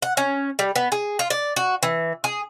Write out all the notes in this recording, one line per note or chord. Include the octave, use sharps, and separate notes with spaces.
F#5
C#4
G3
B3
G#4
F4
D5
F#4
E3
G#4